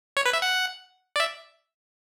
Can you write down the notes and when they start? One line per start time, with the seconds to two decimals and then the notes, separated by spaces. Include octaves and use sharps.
0.17 C#5
0.26 B4
0.33 E5
0.42 F#5
1.16 D5
1.20 E5